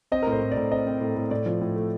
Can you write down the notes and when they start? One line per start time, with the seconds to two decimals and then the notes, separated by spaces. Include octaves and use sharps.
0.12 C4 D#5
0.23 A#4
0.27 A2
0.32 C5
0.42 A2
0.52 D5
0.57 A2
0.71 C4 D#5
0.87 C4
1.01 A2
1.16 A2
1.31 A2 D5
1.46 F3
1.61 A2
1.76 A3